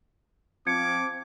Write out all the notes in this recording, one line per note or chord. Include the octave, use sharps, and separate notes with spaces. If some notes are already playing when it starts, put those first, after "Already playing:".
F3 C4 D6 G#6 C#7